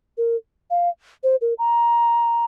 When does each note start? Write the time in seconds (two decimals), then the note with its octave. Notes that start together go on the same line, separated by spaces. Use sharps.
0.18 A#4
0.71 F5
1.24 C5
1.41 A#4
1.59 A#5